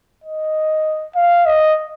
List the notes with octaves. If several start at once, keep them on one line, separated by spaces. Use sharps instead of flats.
D#5
F5
D#5